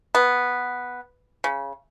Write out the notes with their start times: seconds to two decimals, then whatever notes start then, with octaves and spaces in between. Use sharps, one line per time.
0.15 B3
1.44 C#3